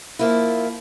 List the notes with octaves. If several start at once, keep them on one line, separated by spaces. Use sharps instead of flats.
F3 A#3 E4